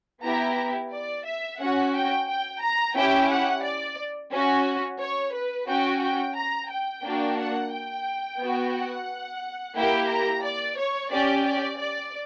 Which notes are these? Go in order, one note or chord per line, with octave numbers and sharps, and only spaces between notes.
B3 E4 G4 A#5
D5
E5
C#4 F#4 F#5
G5
G5
A#5
C#4 E4 G4 G5
F#5
D5
C#4 F#4
C#5
B4
C#4 F#4 G5
G5
A#5
G5
A#3 D4 F#4
F#5
G5
B3 F#4
F#5
A#3 E4 G4 G5
A#5
D5
C#5
C#4 G4 D5
D5
D5